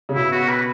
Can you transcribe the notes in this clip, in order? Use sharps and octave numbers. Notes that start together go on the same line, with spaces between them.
C#3
B2 E4
F#4
B4